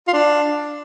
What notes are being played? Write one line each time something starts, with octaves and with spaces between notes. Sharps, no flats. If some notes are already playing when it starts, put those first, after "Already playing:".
F4
D4